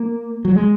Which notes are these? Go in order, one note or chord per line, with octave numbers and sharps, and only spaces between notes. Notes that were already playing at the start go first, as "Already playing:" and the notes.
Already playing: A#3
F#3
G#3